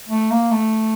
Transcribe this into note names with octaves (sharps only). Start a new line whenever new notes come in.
A3
A#3
A3